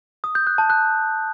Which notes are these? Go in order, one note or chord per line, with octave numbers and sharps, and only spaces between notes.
D#6
G6
F#6
A5
F#6